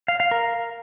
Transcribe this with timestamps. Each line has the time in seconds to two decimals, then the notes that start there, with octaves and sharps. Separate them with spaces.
0.08 F5
0.20 F5
0.31 A#4